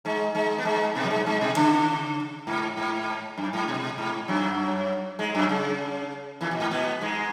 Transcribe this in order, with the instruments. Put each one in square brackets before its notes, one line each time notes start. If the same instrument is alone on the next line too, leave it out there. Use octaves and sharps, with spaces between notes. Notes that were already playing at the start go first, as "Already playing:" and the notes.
[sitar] G#2 G#3
G#2 G#3
B3
G#2 G#3
B2 B3
F#3
G#2 G#3
G#2 G#3
B2
C#3
G#2
G#2
F#2
G#2
B2
G#2
F#2 F#3
G#2 G#3
F#2 F#3
C#3
E2 E3
B2
G#2
B2 B3
G#2 G#3